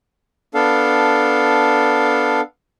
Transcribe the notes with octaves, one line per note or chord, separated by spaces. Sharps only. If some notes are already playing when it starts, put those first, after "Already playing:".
B3 D4 A4 F5